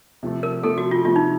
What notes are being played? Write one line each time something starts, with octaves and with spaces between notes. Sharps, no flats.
C3 F3 A3
A#4
C3 F3 A3 A4
F#4
F4
C3 F3 A3 F4
D#4